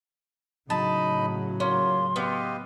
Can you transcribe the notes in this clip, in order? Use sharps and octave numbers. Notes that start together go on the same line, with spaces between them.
A2 C#3 F#3 D#4 D#5 A5 B5
A#3 C#4 F4 C6
B3 G4 D#5 F5